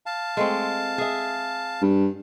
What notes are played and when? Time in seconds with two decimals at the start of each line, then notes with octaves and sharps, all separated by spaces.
0.06 F5 A5
0.37 G#3 A3 C4
0.98 G#4 E5
1.82 G2